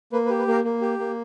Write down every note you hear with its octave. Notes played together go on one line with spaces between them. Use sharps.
A#3 B4
B4
G4
B4
A#3 A#4
A#3
G4
A#3